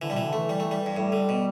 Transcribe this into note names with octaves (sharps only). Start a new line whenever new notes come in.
D3 E3
G3
B2
E3
D3
E3 A3
G3
A3
G3
G2
A2 G3
D3
B2